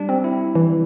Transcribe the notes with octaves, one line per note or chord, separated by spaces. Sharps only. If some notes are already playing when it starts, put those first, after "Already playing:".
Already playing: G3 D4
C4
E4
E3